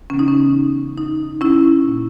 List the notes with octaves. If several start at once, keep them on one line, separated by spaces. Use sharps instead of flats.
C#3 E3 B3 C#4
D#4
C#4
D#4
C#4 E4
A#2 A#3